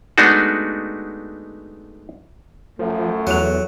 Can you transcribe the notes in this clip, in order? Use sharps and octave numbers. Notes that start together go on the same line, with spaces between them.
G#3 A3 B3 D4 D#4 F#4
F#2 F3 A3
E2 F#3 F4 A4